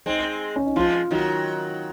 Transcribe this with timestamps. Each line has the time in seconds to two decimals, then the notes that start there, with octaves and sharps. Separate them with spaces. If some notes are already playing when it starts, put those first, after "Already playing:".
0.06 G#3 C4 D#4
0.56 C#4
0.66 D#4
0.76 F3 G#3 F4
1.11 D#3 F#3 F#4